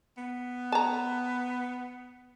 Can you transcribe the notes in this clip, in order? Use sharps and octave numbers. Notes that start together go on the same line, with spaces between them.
B3
A5 A#5